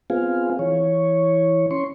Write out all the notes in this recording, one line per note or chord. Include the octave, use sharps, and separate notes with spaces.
B3 C4 F4 G#4 F5
E3 C#5
C#4 C6 C#6